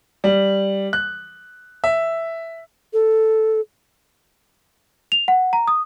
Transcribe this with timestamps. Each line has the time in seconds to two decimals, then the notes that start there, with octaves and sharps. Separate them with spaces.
0.24 G3
0.93 F#6
1.84 E5
2.93 A4
5.12 F7
5.28 F#5
5.53 A#5
5.68 D#6